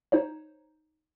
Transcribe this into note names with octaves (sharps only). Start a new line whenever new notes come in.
D#4 C5 C#5